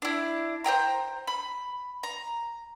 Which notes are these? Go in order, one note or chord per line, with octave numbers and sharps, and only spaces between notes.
D4 E4
C5 D#5 G5 A#5
B5
A#5